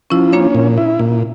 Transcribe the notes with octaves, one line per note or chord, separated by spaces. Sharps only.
F3 C#4 E4
A#3 C#4 D4
A#2
E4
A#2